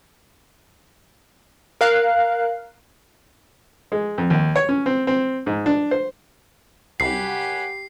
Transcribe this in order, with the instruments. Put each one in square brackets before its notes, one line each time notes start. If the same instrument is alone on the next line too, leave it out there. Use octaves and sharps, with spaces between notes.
[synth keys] A#4 F5 F#6
[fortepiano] G#3
F2
D#2
C#5
C#4
C4
C4
G#2
D4
C5
[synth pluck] C2 [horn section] F#2 F#5 G#5 [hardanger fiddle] G4 B5 [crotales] C7